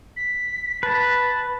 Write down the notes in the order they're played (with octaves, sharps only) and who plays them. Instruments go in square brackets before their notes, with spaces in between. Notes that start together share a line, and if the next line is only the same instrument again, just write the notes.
[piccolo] B6
[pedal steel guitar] B4 [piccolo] A5